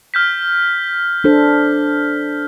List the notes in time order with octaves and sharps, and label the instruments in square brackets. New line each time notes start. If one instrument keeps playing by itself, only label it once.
[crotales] F6 G6 B6
[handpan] D4 A4 C5